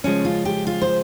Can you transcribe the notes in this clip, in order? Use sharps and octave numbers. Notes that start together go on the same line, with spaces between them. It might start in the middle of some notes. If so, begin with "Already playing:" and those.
C#3 F3 G#3 C#4
F4
G4
F4
C5